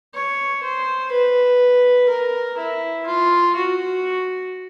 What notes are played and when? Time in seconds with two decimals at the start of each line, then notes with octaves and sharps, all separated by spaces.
0.14 C#5
0.63 C5
1.11 B4
2.09 A#4
2.58 E4
3.06 F4
3.55 F#4